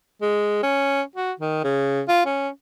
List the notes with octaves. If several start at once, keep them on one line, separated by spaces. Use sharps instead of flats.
G#3
C#4
F#4
D#3
C#3
F4
C#4